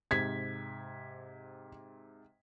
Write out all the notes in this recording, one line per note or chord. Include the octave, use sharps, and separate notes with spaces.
G#2 C3 G#6 B6